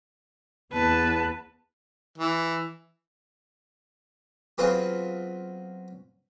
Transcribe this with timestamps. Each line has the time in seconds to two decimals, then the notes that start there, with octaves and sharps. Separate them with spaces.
0.73 E2 B3 B4 A5
2.18 E3
4.58 F#3 B3 C4 F4 G#4 B4